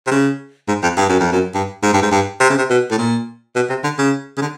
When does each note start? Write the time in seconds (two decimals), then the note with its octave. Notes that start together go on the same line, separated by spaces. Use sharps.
0.07 C3
0.11 C#3
0.68 G#2
0.83 F2
0.97 G2
1.09 F#2
1.20 F2
1.32 F#2
1.54 G2
1.83 G#2
1.93 G2
2.02 G#2
2.11 G2
2.40 C3
2.50 C#3
2.58 C3
2.70 B2
2.91 A2
2.98 A#2
3.56 B2
3.70 C3
3.84 D3
3.99 C#3
4.37 C#3
4.42 D3